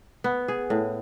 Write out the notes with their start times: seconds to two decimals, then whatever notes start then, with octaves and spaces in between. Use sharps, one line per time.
0.24 B3
0.48 G#4
0.70 A2